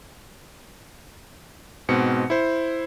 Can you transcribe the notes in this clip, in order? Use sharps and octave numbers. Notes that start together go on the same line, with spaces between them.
G#2 B2 C4 C#7
E4 C5